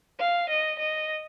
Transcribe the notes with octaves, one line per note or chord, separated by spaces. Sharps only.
F5
D#5
D#5